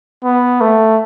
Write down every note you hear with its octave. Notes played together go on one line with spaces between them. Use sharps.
B3
A3